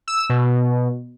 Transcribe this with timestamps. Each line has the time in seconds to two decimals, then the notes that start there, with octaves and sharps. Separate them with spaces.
0.08 E6
0.30 B2